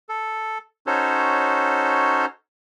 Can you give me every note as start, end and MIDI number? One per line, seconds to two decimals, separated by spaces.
0.09 0.58 69
0.87 2.26 61
0.87 2.26 63
0.87 2.26 66
0.87 2.26 69
0.87 2.26 72
0.87 2.26 73